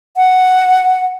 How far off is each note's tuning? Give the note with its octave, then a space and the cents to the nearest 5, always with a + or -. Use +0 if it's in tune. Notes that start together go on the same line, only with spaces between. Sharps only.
F#5 +0